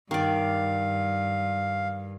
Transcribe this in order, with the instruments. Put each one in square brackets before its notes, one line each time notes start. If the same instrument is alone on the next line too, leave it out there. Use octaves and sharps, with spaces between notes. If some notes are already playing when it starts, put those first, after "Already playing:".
[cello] G2 [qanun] D#3 D5 [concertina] F5